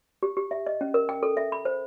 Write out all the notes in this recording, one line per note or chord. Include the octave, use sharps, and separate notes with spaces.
G4
G4
E5
D#5
C#4
A#4
G5
A4
E5
B5
C5